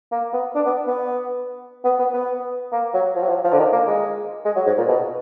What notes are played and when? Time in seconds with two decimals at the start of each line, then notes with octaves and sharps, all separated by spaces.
0.12 A#3
0.33 B3
0.55 D4
0.66 B3
0.88 B3
1.84 B3
1.99 B3
2.13 B3
2.72 A#3
2.94 F#3
3.16 F3
3.23 F#3
3.29 F3
3.44 F3
3.53 D3
3.59 D#3
3.72 A#3
3.87 G#3
4.45 G#3
4.56 F#3
4.67 G#2
4.78 A#2
4.88 B2